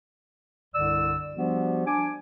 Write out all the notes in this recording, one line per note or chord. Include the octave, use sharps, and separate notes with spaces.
C2 G2 D3 D5 E6
F3 G3 B3 D4 F#4 G4
D4 G#5 D6